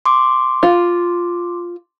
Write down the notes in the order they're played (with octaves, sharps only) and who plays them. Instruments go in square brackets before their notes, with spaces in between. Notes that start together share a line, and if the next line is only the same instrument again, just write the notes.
[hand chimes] C6 D6
[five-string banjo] F4